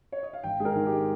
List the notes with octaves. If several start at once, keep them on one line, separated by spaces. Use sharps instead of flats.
C#5
D#5
F5
G#1 G5
G#2 G#4
A#4
D#3
G4
G#3